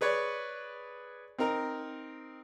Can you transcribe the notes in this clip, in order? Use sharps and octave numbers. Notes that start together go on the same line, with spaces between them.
G#4 B4 C#5 D5
C4 D#4 A#4 A#5